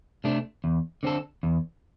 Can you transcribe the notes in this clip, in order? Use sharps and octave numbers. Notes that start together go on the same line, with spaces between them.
C3 A3 D4
E2
D3 C4 A4
E2